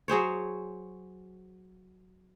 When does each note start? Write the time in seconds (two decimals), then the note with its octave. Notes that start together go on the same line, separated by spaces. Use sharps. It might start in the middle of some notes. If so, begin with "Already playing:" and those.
0.08 F#3 G#4 C5 C#5